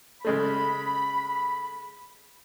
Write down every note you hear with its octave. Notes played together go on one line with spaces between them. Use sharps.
C#3 G#3 A3 B5